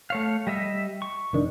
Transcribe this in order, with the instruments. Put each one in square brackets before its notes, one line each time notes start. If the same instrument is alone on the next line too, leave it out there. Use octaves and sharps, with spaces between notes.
[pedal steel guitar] A3 C#5 F5
G3 D#5 E5
C#6
[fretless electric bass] F1 D#3 D4